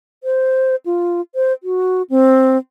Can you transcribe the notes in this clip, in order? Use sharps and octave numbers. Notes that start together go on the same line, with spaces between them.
C5
F4
C5
F#4
C4